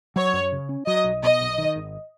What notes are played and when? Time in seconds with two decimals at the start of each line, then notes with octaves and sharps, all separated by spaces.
0.16 F#3 C#5
0.33 F#2
0.52 C#3
0.69 C#4
0.87 F#3 D#5
1.04 B1
1.23 B2 D#5
1.41 B1
1.58 D#3
1.76 G#1